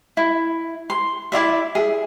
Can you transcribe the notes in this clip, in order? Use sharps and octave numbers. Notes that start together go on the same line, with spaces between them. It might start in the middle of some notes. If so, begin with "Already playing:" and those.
E4
C6
E4 F4 D5 E5
G#4 E5